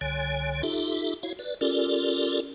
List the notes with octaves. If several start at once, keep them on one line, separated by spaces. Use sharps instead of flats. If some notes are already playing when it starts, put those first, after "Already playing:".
C2 D3 C#5 G#5
D#4 F4 G4 A4 E5
E4 F#4 C#5 F5
B4 D5
C#4 F4 G4 A4 A#4 D5